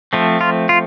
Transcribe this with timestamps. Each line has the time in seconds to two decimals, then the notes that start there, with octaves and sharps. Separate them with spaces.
0.13 F3 A3 C4
0.41 F4
0.69 F4